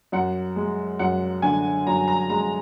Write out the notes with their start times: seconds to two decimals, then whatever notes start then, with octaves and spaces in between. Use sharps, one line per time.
0.12 F#2 F#5
0.56 G#3
0.99 F#2 F#5
1.42 D3 G#5
1.87 F#2 A#5
2.08 A#5
2.30 G#3 A#5